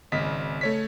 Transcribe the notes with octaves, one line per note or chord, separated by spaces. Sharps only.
G#1 C#3 D#5 B6
A3 C#5 B6